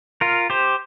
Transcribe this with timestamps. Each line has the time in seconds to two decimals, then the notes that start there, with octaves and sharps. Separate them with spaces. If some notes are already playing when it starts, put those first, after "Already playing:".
0.21 F4 A#4
0.50 G4 C5